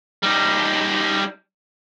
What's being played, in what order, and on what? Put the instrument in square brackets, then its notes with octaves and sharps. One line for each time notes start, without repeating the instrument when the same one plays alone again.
[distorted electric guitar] G3 D#4